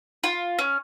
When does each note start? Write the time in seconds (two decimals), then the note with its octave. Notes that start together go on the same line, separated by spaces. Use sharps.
0.24 F4
0.59 C#4